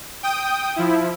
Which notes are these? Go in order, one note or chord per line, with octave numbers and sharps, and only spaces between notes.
G5 D#6
F3 E4